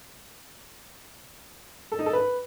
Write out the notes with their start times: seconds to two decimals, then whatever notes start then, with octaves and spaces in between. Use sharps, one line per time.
1.92 A4
1.99 D#4
2.06 A4
2.13 B4